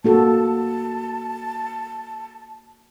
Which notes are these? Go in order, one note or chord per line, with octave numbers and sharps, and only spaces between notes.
A#3 F#4 A4 A5